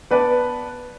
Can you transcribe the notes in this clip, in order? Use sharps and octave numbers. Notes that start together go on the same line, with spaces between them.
B3 B4 D5 A5